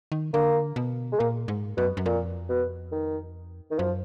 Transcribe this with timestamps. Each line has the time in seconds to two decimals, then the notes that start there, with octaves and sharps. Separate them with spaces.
0.12 D#3
0.33 D3 A#3
0.76 B2
1.12 G#3
1.19 A#2 A#3
1.48 G#2
1.77 F#2 B2
1.97 F#2
2.06 F2 A#2
2.49 B2
2.92 D#3
3.71 D#3
3.79 F#2 F3